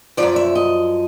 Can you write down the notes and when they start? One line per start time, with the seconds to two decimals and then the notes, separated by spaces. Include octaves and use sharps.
0.17 C#3 F3 D5
0.23 F#2
0.36 E5
0.55 D#5